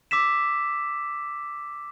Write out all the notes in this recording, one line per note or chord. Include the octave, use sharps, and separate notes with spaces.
D6 E6 B6 E7